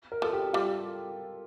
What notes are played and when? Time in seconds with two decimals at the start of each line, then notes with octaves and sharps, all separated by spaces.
0.12 A#4
0.22 F3 A4
0.33 G4
0.53 G3 F4